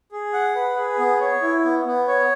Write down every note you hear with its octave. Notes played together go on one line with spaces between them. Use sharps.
G#4
F#5
B4
G#4
B3
C#5
E4
B3
B3
C#5